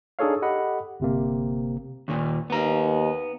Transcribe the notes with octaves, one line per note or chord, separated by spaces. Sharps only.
D4 D#4 G#4 A4 C#5 F5
G4 A4 D#5 F#5 B5
G1 C3 A#3
D#2 A#2
D#2 B3 A#5